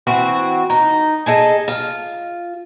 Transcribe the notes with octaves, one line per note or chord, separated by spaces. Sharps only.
E3 C4 F#4
D#4
G#4 A4 D#5
F4